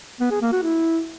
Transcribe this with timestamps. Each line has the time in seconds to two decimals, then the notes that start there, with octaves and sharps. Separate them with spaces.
0.21 B3
0.31 G#4
0.42 A#3
0.52 F#4
0.63 E4